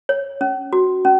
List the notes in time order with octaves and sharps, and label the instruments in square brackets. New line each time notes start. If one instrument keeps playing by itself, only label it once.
[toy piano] C#5
C#4
F#4
C#4